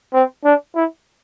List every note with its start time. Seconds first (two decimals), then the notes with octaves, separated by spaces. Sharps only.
0.14 C4
0.45 D4
0.76 E4